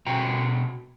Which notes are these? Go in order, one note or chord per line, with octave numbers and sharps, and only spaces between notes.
B2 F#4 G5 A#5